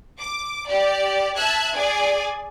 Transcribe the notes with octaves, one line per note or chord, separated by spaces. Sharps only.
D6
G4 D5
E5 A5 E6 F#6 G#6
G#4 D5 G#5